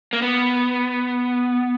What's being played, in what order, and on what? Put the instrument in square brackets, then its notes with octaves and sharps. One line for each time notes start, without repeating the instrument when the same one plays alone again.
[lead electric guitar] A#3
B3